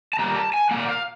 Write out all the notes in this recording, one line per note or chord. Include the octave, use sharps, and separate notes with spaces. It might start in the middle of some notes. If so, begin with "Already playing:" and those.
A5
A#2 G3 A#3 A#5
A5
G#5
A#2 G3 A#3 F#5
F5